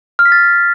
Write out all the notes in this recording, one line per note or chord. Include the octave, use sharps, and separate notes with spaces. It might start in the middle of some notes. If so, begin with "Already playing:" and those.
F6
B6
A6